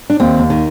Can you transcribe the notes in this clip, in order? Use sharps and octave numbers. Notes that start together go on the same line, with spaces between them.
D4
D#2 C4
D#2
D#3